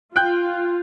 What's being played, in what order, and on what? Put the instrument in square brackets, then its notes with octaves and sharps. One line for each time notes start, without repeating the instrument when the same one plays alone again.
[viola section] F4 [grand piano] G5 F#6 G6